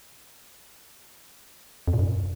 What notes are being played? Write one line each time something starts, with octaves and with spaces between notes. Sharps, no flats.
F2
A#2
F#2